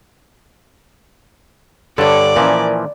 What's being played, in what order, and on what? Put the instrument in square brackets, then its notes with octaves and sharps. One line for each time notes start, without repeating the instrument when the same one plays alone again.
[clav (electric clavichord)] G2 D3 [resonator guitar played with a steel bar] A4 C#5 [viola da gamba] D5
[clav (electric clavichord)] A#2 E3 F3 [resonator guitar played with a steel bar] C#4 A#4